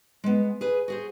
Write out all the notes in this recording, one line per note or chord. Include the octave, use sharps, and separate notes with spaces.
G#3 B3
G#4 B4 G#5
F#4 G#4 C5